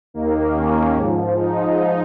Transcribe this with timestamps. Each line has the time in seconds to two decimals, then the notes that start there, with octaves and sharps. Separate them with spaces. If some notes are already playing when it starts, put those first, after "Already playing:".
0.14 D#2 D#3 A#3
0.54 C#4
0.95 G#2 F3
1.36 D#4